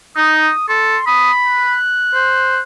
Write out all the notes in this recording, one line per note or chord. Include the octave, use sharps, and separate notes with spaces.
D#4 D#6
A4 C6
B5 D#6
F#6
C5